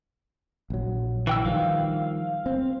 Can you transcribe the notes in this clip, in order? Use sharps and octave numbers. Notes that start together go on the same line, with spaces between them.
A#1 F#3
E3 G5 E6
D#3 F3 G3 F5
C4